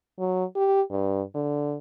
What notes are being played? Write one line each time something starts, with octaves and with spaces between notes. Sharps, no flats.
F#3
G4
G2
D3